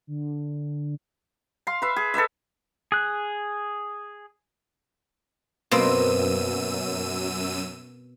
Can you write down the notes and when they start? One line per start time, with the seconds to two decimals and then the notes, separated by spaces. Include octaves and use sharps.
0.07 D3
1.67 F5 C6
1.82 B4 E5
1.96 G#4
2.14 A4 B4 D#5 E5
2.92 G#4 F#6
5.71 F#2 B2 A#3 C4 E6 D#7